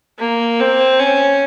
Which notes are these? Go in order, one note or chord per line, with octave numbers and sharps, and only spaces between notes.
A#3
C4
C#4